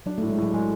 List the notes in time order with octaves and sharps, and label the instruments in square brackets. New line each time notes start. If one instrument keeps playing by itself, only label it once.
[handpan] F#3 [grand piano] D4
[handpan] A3
[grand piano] A2
[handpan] G#3
[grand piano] A2 [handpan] F#3
[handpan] F#3 [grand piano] G#3